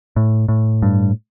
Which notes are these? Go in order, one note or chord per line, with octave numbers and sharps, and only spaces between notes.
A2
A2
G2